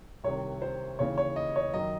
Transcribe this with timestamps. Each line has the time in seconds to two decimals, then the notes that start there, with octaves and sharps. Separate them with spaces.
0.24 C2 C3 D#3 C#5
0.62 C5
0.99 D#2 C#3 E3 C#5
1.18 C#5
1.36 D#5
1.56 C#5
1.74 F#2 D#3 D#5